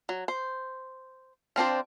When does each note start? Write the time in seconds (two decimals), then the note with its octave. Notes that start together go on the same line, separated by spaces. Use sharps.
0.09 F#3
0.28 C5
1.56 F3 C4 D4 C5